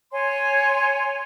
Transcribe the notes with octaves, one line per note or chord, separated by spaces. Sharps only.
C#5 G#5 C6